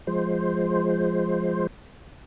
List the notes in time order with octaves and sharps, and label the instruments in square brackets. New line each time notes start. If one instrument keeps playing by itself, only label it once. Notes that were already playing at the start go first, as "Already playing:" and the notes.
[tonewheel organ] F3 G#3 C5